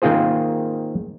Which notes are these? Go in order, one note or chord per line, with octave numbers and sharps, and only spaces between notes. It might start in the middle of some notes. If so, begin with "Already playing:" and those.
D#3 A#3 C4 F4 G#4 C5